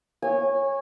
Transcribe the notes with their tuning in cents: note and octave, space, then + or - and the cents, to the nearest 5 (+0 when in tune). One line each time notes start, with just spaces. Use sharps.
C#5 -15 G#5 -25